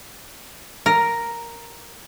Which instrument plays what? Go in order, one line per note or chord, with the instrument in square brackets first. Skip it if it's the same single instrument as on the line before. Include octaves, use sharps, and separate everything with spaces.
[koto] A#4